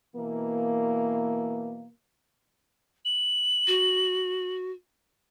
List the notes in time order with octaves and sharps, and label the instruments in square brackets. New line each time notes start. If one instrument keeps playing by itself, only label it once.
[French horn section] B2 E3 A#3
[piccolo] F#7
[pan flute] F#4